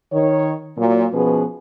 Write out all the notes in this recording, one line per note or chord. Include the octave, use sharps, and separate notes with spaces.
D#3 C#5
A#2 F#3 A#3
B2 F3 B3 C#4 G#4 B4